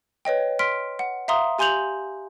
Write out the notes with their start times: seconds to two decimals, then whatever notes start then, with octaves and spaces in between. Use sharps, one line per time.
0.25 B4 C#5 D#5 G5
0.59 C6 F6 B6 D7
0.99 F#5
1.28 E5 F5 A#5 C6 D#6
1.59 G4 G#5 C6 G6 F7 F#7